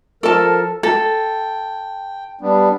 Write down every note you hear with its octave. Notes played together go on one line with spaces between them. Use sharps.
F3 A4 A#4 A5
A4 G5
G3 B3 D4